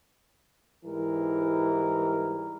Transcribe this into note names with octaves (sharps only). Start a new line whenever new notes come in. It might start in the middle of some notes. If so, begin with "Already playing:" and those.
G#2 E3 G3 A#4